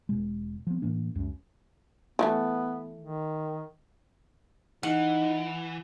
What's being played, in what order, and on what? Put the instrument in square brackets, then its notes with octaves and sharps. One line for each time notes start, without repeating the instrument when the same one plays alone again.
[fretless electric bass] E1 B2 G#3
F3 B3
A2 E3 A#3 D4
C#2 F#2
[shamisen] E3 F3 A3 [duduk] B3
[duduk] D#3
[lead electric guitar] E3 [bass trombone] D#4 [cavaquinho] F#5